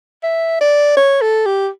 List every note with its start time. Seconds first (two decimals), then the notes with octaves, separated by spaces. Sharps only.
0.23 E5
0.60 D5
0.97 C#5
1.21 A4
1.46 G4